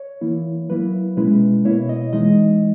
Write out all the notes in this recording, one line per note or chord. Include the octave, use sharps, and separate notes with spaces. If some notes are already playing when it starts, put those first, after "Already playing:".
Already playing: C#5
E3 A#3 E4
F#3 A#3 E4 B4
B2 G#3 C#4 E4 B4
B2 A#3 E4 C#5
D#5
E3 G#3 D#4 D#5